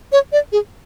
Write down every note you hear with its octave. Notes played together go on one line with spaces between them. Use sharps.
C#5
D5
G#4